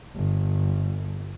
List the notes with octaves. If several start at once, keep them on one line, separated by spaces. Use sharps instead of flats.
G1